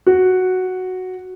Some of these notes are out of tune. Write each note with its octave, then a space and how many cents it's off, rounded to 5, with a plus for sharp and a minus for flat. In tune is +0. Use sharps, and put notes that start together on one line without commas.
F#4 +0